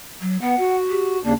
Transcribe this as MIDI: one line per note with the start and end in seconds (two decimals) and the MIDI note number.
0.21 0.38 54
0.42 0.55 59
0.42 0.76 78
0.59 1.19 66
0.90 1.17 67
1.24 1.33 39
1.24 1.33 49
1.24 1.32 58
1.24 1.33 62